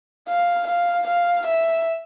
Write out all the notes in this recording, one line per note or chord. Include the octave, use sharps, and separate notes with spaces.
F5
F5
F5
E5